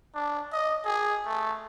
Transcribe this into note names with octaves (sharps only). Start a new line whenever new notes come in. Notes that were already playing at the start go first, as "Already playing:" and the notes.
D4
D#5
G#4
A3